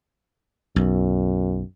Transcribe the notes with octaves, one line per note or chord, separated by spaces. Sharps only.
B1 F#2